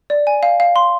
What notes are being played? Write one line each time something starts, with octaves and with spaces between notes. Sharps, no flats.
D5
G#5
F5
F5
C6